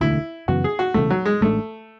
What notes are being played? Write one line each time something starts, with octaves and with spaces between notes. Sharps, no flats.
E1 D2 D3 A3 E4
F#2 C#3 E3 B3 F#4
G#4
F#4
E1 E2 C#3 A3
F#3
G#3
A1 A2 G#3 A3 D4